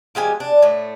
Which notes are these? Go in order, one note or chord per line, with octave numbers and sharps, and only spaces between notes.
F3 G#3 G4 G#5
D4
A2 A3